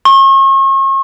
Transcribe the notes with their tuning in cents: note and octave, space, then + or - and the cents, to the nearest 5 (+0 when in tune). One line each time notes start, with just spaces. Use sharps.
C#6 -40